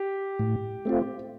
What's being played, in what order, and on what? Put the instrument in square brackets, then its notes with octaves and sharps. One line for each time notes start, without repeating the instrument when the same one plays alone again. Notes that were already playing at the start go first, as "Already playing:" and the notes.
Already playing: [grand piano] G4
[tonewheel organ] A2
A3 C4 F4